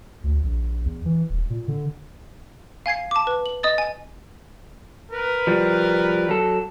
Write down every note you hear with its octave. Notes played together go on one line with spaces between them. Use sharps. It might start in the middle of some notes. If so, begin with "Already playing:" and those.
D2
A#1
E2
E3
D#1
A#2
D3
F5 G#5 G#6 C7
A5 D6
B4
F#7
D#5 D#6 A6
G#5
A#4 B4
F3 G3
F#3 A4